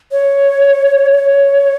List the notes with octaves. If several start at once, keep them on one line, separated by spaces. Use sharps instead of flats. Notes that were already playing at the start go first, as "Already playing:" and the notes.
C#5
C#5